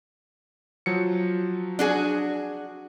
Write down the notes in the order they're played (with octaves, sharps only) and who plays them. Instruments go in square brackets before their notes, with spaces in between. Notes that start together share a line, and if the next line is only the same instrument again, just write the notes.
[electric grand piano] F3 F#3 C#7
[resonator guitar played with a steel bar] D4 F#4 G#4